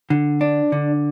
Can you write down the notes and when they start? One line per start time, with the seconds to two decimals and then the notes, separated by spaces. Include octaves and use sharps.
0.10 D3
0.41 D4
0.72 D3